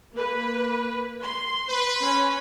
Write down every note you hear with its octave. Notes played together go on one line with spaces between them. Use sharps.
A#3 B4
C6
B4
C#4